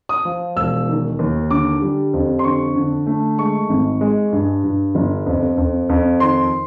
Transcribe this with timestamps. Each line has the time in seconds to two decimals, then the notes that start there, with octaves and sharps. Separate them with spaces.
0.09 D#6
0.25 F3
0.56 E1 E6
0.88 D#3
1.19 D#2
1.50 D3 D6
1.82 G3
2.14 F2
2.39 C6
2.44 D3 C#6
2.76 D3
3.07 A3
3.39 G#3 C#6
3.69 G#1
4.01 G#3
4.33 G2
4.64 G2
4.95 G1
5.26 F2
5.58 F2
5.89 F2
6.20 D#3 C6